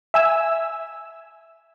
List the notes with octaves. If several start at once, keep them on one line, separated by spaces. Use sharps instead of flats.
E5 G#5 E6